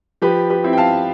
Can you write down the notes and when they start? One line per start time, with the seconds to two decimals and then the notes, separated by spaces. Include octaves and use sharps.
0.22 F3 G4 B4
0.50 G4 B4
0.64 C4 E4
0.73 G5
0.77 F5 A5